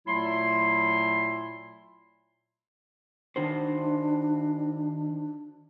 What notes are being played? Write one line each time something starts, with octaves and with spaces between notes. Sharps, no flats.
A#2 F#3 A3 E4 C6
D#3 D4 F#4 C5